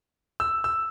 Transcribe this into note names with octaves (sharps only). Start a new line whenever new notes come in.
E6
E6